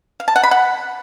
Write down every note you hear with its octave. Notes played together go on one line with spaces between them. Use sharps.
F5
A5
F#5
B5
F#5